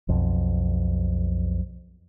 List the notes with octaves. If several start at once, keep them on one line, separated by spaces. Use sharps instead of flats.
B1 F2